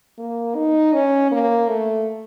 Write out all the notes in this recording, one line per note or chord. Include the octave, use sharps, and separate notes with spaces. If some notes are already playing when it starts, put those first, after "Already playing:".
A#3
D#4
C#4
A#3
A3